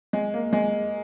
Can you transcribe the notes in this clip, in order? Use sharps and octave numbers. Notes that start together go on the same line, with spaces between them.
G#3
A#3
G#3